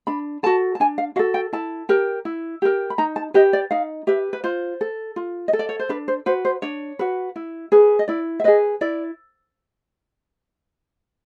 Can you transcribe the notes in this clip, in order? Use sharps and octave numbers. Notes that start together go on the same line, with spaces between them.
D4 B5
F#4 A4 A5
A5
D4 G#5
F5
F#4 A4 F5
G5
E4 A5
G4 A#4
E4
G4 A#4
B5
D#4 A#5
A5
G4 B4 D#5
D5
D#4 F5
G4 B4 E5
B4
F4 C5
A4
F4
D#5
A4
D5
C#5
C5
D4 B4
C5
F#4 B4 C5
C5
D4 C#5
F#4 B4
E4
G#4 B4
D#5
E4 D5
E5
G#4 B4 D#5
E4 D5